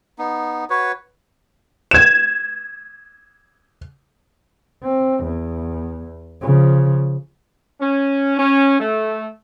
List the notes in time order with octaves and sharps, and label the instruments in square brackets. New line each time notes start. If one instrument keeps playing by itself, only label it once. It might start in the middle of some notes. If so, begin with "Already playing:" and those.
[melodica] B3 D#4
F#4 B4 C#5
[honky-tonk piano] G#6 E7
[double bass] C4
E2
C#3 F3
[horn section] C#4
C#4
A3